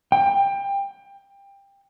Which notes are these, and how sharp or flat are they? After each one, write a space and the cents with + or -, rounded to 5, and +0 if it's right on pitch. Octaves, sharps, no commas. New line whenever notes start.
G5 +20